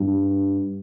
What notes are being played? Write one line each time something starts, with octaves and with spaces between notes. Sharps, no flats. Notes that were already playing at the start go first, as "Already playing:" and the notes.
Already playing: G2